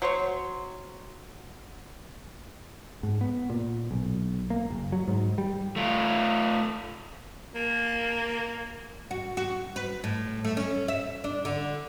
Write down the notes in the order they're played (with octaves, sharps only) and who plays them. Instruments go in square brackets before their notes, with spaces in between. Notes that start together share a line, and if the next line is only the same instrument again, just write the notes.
[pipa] F#3 C5 C#5
[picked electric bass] G#2
B3
A#2
B1
A#3
F#1
F#3
G#2
G3
[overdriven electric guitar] A3 F4
[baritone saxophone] A#3
[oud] F#4
F#4
B4
A2
A3
C#4
E5
D4
D3